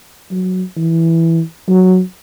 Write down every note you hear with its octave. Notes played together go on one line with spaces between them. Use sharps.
F#3
E3
F#3